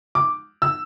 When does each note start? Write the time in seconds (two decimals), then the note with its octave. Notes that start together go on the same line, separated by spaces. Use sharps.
0.15 D6
0.62 E6